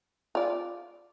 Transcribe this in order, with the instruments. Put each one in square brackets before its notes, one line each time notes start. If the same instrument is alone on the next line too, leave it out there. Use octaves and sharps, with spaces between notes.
[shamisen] F4 D5